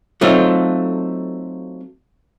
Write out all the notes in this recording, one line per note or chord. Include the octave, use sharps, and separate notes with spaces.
F#3 A3 C4 D#4 F4